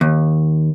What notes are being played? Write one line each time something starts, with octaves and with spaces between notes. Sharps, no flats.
D#2